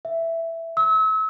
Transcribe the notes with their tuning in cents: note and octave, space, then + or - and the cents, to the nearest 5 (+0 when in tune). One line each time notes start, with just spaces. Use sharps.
E5 +5
E6 -35